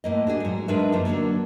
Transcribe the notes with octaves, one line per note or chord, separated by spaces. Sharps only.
A2 A#3 D#5
D4 F#4 G#4
G#2 F#3
G#3 D4 D#4 A#4 B4 E5
F#2 F3 A#3
D3 F#3 G3 A#3 D4